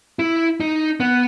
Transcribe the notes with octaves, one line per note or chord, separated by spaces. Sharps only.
E4
D#4
B3